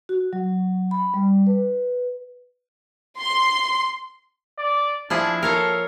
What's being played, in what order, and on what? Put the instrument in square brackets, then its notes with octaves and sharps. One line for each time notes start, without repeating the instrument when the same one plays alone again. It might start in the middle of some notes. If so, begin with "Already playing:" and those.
[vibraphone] F#4
F#3
B5
G3
B4
[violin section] C6
[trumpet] D5
[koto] F3 E4 G#4 [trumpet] D4
[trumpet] A4 [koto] A#4 C#5 F5